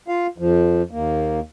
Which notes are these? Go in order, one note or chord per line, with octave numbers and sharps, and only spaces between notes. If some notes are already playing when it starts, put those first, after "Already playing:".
F4 F5
F2 F3
D#2 A#3